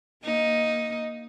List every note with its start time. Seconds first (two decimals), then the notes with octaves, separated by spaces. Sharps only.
0.23 A#3 D#4